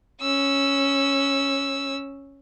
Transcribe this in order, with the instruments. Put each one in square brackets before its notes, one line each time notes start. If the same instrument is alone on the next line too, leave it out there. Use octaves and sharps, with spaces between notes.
[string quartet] C#4 E6